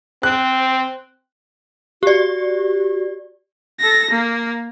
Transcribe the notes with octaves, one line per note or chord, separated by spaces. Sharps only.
C4 F#6
F#4 G4 D5
A4 A#6
A#3